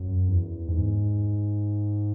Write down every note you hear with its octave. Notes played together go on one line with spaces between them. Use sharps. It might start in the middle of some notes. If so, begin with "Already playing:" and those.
Already playing: F#2
E2
G#2